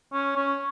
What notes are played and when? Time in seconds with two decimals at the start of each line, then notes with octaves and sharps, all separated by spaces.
0.13 C#4
0.36 C#4